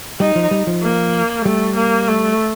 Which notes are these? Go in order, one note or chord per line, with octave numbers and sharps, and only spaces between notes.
G3 D#4
F3
G3
F3
A#3
G3 A3
A#3
A3